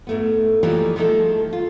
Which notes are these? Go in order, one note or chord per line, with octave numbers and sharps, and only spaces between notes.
G#2 A3 B3
E3 F3 G3 A3 A#3 D#4
D#3 F3 A3 D#4 G#4 A4
F4